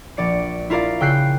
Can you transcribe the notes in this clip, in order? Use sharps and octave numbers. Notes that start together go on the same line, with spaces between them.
A#1 D5 C#7
E4 F4 A#4 D5 F5
C#3 G5 E6 F#6 G6 C7